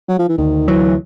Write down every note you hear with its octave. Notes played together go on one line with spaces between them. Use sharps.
F#3
F3
E3
D2 D#3
E3 F#3